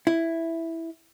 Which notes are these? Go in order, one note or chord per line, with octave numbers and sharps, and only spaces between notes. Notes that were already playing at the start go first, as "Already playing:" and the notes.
E4